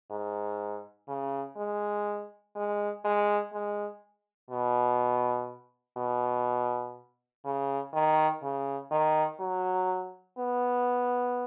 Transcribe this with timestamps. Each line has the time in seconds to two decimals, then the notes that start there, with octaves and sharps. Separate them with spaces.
0.11 G#2
1.08 C#3
1.57 G#3
2.56 G#3
3.04 G#3
3.53 G#3
4.51 B2
5.97 B2
7.45 C#3
7.94 D#3
8.43 C#3
8.91 D#3
9.40 F#3
10.38 B3